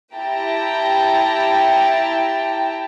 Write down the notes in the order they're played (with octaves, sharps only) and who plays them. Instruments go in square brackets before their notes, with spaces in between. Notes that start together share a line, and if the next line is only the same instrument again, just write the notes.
[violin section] E4 G4 G5 A5 A#5